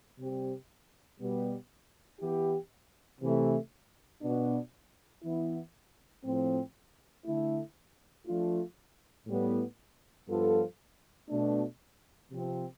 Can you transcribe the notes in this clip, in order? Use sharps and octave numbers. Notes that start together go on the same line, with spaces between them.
C3 G3 C4 G4
B2 G3 B3
E3 B3 E4 G4
C3 E3 A3
B2 B3 D4
E3 B3 E4
A2 F3 C4
D3 A3 E4
F3 A3 D4 F4
A2 G3 B3
G2 F3 B3 F4 A4
B2 A3 D4
C3 F3 C4